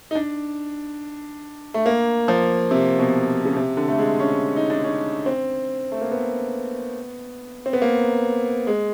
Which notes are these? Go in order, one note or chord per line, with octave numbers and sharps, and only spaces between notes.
D#4
D4
A3
A#3
F3
C3
B2
C#3
C3
D3
A3
G#3
C#4
D#4
D4
C#4
C4
A3
A#3
B3
C4
B3
A#3
G#3